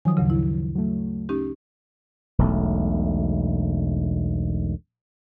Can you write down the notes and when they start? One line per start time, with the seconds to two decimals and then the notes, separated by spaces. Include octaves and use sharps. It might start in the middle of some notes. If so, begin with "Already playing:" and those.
0.05 D#3 F3 F#3 G#5 D#6
0.17 D2 G2 C#3
0.30 E4
0.75 F#3 A3
1.29 C#4 D#4 G4
2.39 E1 B1 A3